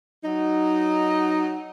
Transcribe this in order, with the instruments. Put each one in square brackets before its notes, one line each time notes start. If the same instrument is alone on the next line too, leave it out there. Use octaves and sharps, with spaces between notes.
[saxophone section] F#3 D#4